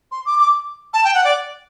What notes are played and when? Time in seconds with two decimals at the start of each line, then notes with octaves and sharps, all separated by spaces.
0.12 C6
0.26 D6
0.39 D6
0.94 A5
1.04 G5
1.14 F#5
1.25 D5